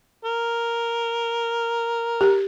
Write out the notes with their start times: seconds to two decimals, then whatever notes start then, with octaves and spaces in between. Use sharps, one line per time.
0.25 A#4
2.21 G4